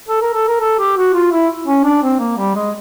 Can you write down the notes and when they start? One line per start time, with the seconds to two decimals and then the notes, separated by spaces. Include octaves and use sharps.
0.09 A4
0.22 A#4
0.34 A4
0.48 A#4
0.60 A4
0.79 G4
0.97 F#4
1.14 F4
1.32 E4
1.67 C#4
1.84 D4
2.03 C4
2.19 A#3
2.37 G3
2.55 G#3